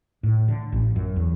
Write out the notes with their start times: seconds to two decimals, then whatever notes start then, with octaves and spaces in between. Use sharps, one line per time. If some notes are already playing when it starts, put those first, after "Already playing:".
0.23 A2
0.48 D3
0.72 A1
0.96 F#2
1.16 E2